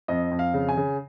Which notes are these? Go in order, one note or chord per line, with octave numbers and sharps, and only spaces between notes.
F2 D#5
F2
F5
C#3
G#5
C#3